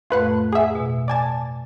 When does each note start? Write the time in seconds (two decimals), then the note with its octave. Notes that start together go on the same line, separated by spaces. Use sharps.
0.10 F2 A2 A3 F4 B4 F#5
0.53 G#4 E5 F#5
0.75 B2
1.08 D5 G#5 A5